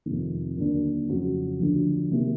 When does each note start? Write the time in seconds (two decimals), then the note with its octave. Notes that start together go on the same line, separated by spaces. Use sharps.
0.06 F2 C3 D#3
0.57 D#2 D3 F#3 A#3 D4
1.09 F2 C#3 F#3
1.60 D2 D3 F3
2.11 C3 D#3 F#3 A#3